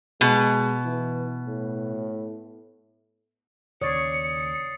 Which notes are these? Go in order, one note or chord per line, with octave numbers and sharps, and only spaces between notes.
B2 G#3
E3
A2
D#2 C#3 C#5 D5 D#6 A6 C7 C#7